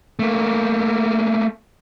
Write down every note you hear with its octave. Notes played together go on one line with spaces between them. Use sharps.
A3 A#3